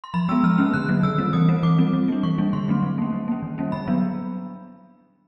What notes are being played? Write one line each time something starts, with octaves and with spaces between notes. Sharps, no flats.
C6
F3 B5
G#3 B3 E6
F3 F6
A#3 C#4
D3 F#6
F#3 A#3
D#3 E6
G3 C4
E3 D#6
G3 C4
E3 D6
G3 C4
G3
A#3 D4
E3 C#6
G3 A#3 D4
D3 C6
F#3 A3 C4
F#3
A#3 C#4
G3
A#3 C#4
D#3
G3 A#3 C#4
D3 B5
F#3 B3 D4